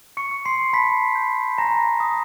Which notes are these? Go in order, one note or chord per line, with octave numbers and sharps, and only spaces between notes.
C#6 C#7
C#6
C6 C7
A5 B5 B6
G6
G#5 A#5 A#6
D#6